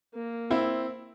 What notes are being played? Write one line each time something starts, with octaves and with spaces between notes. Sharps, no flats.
A#3
C4 E4